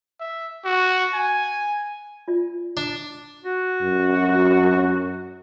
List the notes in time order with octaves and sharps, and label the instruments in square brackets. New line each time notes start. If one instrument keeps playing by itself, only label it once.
[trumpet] E5
F#4
G#5
[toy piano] F4 D5
[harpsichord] D4
[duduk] F#4
[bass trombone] F#2